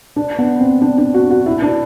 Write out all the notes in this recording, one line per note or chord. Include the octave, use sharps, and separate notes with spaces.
D4
B3
C4
D4
D4
F#4
F#4
E4
D4